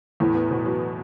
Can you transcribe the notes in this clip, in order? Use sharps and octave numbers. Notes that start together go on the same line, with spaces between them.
E2 A2
B3
B2
F#3